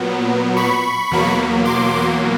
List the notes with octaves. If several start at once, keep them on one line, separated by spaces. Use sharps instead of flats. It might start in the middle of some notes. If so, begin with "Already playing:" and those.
Already playing: A#2 F#3 B3
B5 C#6
E2 B2 F#3 A#3
C6 D6